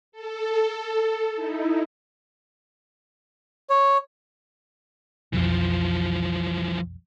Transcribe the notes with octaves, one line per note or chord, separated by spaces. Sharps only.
A4
D#4 E4
C#5
B1 F2 E3 F3